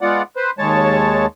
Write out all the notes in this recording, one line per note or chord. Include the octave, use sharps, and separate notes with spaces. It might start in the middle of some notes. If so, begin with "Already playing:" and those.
G#3 B3 F4 D5 F#5
B4 C5
D#2 G#3 C#5 A5